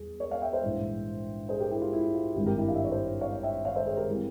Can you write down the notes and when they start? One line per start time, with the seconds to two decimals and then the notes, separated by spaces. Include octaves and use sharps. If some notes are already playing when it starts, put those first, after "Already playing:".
Already playing: E2 G3 G#4
0.20 A#4 C#5
0.31 C#5 F5
0.42 E5 G5
0.53 C5 E5
0.63 A#1 G#2 E3 G3
1.49 G#4 C5
1.60 G4 A#4
1.71 E4 G4
1.82 F4
1.93 E4
2.14 F4
2.35 G#1 G2 G3 C4 E4 G4
2.46 G4 A#4
2.57 E4 G4
2.68 F5
2.75 E5
2.84 C#5
2.91 C5 E5
3.21 C#5 F5
3.43 E5 G5
3.65 C#5 F5
3.75 C5 E5
3.86 G#4 C5
3.97 G4 A#4
4.08 E3 G3 C4